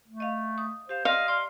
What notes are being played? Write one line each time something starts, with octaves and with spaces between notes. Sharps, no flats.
A3
D#5 F5
D#6
G4 C5 F5
D5 D#5 F5 C6
D5 C6 F6